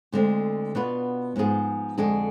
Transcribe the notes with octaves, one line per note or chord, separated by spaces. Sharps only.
D2 D3 G#3 C4
B2 B3 D4 F4 B4
G#2 F3 B3 F4 G#4
F2 D3 G#3 D4 G#4